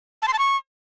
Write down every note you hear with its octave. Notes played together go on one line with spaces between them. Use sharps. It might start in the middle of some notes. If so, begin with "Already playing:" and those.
A5
C6
A5
C#6